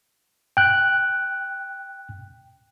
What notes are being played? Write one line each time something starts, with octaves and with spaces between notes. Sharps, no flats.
G5 F#6